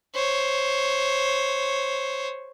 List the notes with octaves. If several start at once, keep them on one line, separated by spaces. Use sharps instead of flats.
C5 C#5